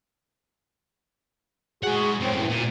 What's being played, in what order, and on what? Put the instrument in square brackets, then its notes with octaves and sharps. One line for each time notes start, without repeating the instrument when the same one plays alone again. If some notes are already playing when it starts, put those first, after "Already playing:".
[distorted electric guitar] G#3 F#5 [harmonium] F#4 G#4
[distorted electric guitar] F#2 A2 [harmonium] C#3 C4
[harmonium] E3
[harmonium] D2 [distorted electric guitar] A#2